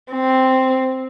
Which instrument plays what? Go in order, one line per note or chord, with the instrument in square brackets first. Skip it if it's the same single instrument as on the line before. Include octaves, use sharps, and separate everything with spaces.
[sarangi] C4